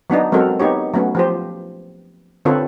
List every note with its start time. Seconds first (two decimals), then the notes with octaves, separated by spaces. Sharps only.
0.10 F#3 B3 D4 D#4
0.32 F#3 G#3 C4 F#4 A4 A#4
0.60 B3 D#4 G4 C#5
0.94 F#3 A3 B3 C#4
1.15 F3 G4 C5
2.45 D3 C4 F4 A4 B4 C#5